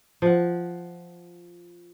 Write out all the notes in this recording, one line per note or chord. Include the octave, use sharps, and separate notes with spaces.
F3 F#5